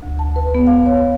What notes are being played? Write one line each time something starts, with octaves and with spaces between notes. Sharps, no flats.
D2
A5
B4
B3
F5
C#5